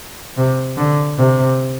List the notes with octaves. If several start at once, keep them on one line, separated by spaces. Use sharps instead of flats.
C3
D3
C3